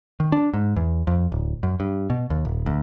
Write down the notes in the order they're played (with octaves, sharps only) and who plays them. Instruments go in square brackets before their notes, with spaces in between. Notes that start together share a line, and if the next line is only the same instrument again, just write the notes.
[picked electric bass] D#3
D4
G#2
E2
F2
D1
F#2
G2
B2
D#2
D#1
D2